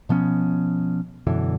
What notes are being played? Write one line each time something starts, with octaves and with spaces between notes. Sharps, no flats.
B2 F3 B3 C#4
F#2 B2 D3 E3